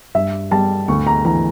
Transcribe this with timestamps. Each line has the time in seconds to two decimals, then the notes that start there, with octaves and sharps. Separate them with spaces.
0.15 G2 E5
0.51 G3 A5
0.88 D2 C#6
1.07 A#5
1.25 E3 A#5